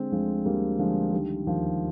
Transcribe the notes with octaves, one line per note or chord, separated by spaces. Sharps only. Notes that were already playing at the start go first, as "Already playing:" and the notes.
Already playing: D3 G#3 C4
D2 F3 G#3
D2 G3 A#3
D3 F3 G#3
D#3 G3
D#2 F3